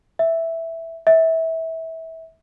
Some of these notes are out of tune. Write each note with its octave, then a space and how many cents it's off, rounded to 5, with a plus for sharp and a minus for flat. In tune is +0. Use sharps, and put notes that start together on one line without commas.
E5 +0
E5 -25